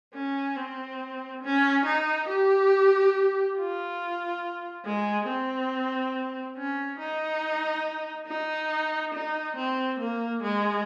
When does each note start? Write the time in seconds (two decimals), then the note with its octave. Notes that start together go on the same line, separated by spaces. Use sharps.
0.14 C#4
0.56 C4
1.43 C#4
1.85 D#4
2.28 G4
3.57 F4
4.85 G#3
5.28 C4
6.57 C#4
6.99 D#4
8.28 D#4
9.14 D#4
9.57 C4
10.00 A#3
10.43 G#3